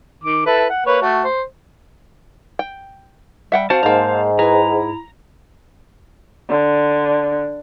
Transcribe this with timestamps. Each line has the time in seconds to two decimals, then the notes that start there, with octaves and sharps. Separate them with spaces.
0.24 D#3 D6
0.46 E4 A4 B4
0.70 F#5
0.86 A#3 B4 C#5
1.02 A3 F#4
1.24 C5
2.59 G5
3.52 G3 E5 F#5 G5
3.70 C4 F#4 C5 F5 A5
3.83 G#2 A#3 A#5
4.39 E4 G#4 B4 A#5
6.49 D3